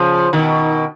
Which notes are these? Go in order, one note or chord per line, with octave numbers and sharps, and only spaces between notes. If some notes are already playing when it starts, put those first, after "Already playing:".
Already playing: C#3 F3
B2 D#3